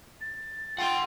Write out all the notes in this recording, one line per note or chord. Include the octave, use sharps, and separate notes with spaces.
A6
F4 F#5 G5 C6